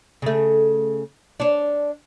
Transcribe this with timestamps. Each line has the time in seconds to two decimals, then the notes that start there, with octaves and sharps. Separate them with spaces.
0.22 C#3 A3
1.40 D4 C#5